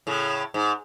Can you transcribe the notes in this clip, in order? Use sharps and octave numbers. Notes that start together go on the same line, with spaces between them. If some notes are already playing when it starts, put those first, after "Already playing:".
A2 C#3
G#2